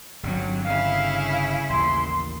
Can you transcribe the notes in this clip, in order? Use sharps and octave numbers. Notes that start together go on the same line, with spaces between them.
G1 G2 F#3 C4
C#3 E4 F5
A1 D#2 C6